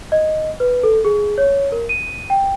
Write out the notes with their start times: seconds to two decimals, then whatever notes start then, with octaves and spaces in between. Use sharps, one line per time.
0.12 D#5
0.60 B4
0.83 A4
1.05 G#4
1.38 C#5
1.72 A#4
1.89 D#7
2.30 G5